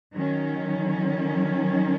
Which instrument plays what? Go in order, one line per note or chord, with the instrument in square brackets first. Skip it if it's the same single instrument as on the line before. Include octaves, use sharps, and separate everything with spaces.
[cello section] D#3 F#3 C#4